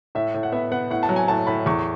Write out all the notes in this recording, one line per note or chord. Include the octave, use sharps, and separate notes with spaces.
A2 E5
A2
F#5
B3 E5
B3 F#5
A2 F#5
A5
F#3
G#5
A2 A5
A2 B5
E2 C#6